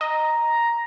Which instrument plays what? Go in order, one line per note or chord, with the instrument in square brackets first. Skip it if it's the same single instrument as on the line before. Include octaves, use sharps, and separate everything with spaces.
[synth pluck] D#5 [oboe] A#5